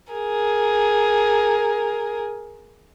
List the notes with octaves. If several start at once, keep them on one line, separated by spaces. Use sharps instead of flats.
G#4 A#4